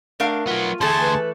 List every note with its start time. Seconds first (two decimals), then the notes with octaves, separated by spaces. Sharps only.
0.20 A3 D4 A#4 F5
0.47 F#3 B3 F4
0.81 D2 E3 A3 G#4 A4 C5 G#5 A5
1.01 B4